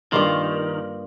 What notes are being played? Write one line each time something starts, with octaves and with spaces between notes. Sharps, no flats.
G2 D#3 A#3 F4